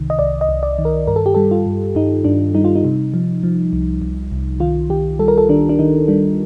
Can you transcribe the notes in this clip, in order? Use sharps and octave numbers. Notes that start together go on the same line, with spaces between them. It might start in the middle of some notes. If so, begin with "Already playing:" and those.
Already playing: C2 C3 D#3
D#5
C2 D5
D#5
C2
D5
D#3
A#4
G2 A#4
A4
G4
G3 A4
F4
G2
G2 D#4
G2 D4
G3 D#4
F4
D#4
C3
F3
F3
C2
C2
C2
D#3 F4
D#3 G4
G3 A4
A#4
A4
D#3 D4
D4
D#3 D#4
G3 D4